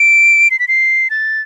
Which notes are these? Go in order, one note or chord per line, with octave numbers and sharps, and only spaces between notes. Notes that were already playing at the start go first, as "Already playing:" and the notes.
Already playing: D7
C7
B6
C7
A6